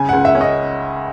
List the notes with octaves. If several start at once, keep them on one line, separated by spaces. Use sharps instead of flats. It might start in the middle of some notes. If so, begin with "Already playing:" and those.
Already playing: C#3 G#5
C#2 F#5
E5
C#4
D#5